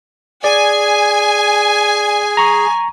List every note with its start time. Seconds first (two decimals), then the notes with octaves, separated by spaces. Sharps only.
0.44 G#4 D5 G#5
2.37 A#5 C#6